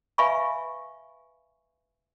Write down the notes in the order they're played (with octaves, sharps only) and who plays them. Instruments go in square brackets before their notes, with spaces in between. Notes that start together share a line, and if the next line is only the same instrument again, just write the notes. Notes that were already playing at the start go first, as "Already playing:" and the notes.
[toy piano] B4 E5 F5 G#5 B5 C#6